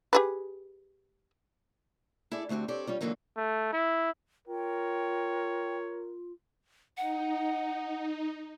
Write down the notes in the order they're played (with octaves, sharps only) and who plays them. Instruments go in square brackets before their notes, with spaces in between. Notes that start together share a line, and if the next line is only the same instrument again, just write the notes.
[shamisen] G4 G#4 B4
[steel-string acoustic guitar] E4 G#4 A4 D5
D2 A3 C4 F#4 G4
C4 G4 A4 C#5 D5
G3 C#4 F4
G#2 D3 E3 F#3 A#3 D#4
[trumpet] A3
E4
[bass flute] F4 [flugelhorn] A#4 [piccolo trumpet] C#5 [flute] G5
[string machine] D#4 [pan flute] F#5